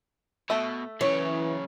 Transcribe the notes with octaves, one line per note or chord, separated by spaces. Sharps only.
B2 A3 E5
F#2 C#3 E3 C#5